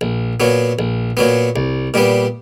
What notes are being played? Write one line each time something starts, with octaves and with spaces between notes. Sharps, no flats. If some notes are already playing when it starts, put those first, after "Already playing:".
A#1
A#2 F#3 B3
A#1
A#2 F#3 B3
C2
A#2 G3 B3